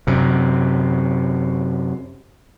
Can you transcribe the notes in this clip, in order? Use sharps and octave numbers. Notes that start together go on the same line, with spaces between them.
F#2 C3